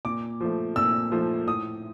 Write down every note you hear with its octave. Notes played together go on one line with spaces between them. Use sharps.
A#2 D6
F3 A3
A#2 E6
F3 A3
A2 D#6